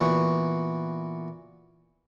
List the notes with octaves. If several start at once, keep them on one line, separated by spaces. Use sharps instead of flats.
A#2 E3 B3 F#4